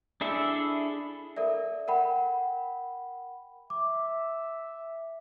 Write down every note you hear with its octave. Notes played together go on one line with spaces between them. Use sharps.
D4 E4 G#4 A4 E5
A4 A#4 D5 E5
A#4 F#5 G5 B5
E5 D6